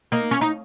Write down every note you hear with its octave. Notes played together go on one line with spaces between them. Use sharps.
A#3 D#4
C#4
D#4